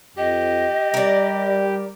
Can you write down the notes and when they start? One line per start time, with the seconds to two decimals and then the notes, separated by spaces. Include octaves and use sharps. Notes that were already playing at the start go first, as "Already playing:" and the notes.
0.17 F2 G4 D#5
0.94 G3 A#4 D5